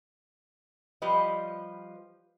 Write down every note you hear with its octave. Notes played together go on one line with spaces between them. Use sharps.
F3 G3 G4 B4 D#5